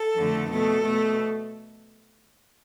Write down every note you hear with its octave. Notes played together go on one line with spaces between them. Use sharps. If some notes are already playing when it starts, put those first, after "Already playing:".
Already playing: A4
F2 D3 A3
B2 A3 A4
B2 A3